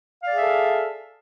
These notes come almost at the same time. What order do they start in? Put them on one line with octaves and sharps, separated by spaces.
F5 D5 G#4 E5 A4